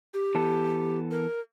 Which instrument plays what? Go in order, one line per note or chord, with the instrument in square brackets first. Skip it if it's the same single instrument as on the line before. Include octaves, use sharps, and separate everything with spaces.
[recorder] G4
[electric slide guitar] E3 B3 A4
[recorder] A#4